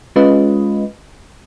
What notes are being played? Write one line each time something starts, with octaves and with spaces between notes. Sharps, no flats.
G#3 C#4 F4 B4 D#5